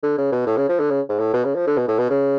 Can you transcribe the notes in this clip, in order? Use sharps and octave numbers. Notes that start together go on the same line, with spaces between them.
D3
C#3
B2
A2
C#3
F3
D3
C#3
G#2
A2
B2
C#3
F3
D3
B2
A2
B2
C#3